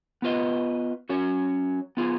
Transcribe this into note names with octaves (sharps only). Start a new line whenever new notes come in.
B3 F4 B4 D#5
F#3 C#4 F#4 C#5
B3 F4 G#4